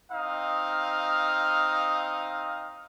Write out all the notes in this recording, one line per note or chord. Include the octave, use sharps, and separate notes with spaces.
C4 D#4 F5 D#6